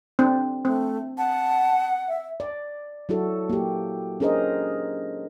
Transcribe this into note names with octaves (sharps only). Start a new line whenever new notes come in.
C4 D4
A3 C4
F#5 A5
E5
D5
F#3 E4 F#4 A4
A#3 G4
C#4 D4 G#4 A#4 C5 D#5